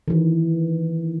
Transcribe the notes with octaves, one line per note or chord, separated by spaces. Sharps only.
D#3 E3